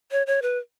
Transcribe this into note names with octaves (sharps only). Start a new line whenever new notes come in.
C#5
C#5
B4